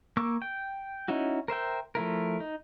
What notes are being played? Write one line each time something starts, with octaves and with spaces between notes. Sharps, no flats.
A#3 C#6 D6 E6
G5
C#4 D#4 E4 F#4
A#4 C5 E5 G5
F3 A3 E4 A#4
D#4